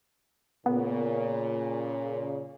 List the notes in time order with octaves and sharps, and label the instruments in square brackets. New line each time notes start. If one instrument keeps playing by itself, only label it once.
[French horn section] A#2 C#3 [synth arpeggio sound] B3